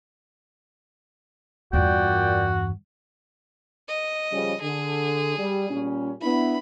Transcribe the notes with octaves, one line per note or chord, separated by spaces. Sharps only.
E2 G2 A#2 F#4 D5 G5
D#5
C#3 F3 G3
D3 G#4
G3
A#2 G3 C#4
B3 D4 E4 B5